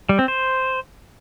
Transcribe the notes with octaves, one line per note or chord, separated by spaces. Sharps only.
G3
C4
C5